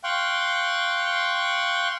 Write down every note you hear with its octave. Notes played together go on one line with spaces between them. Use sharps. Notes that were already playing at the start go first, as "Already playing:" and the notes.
F5 G5 C6 C#6 F#6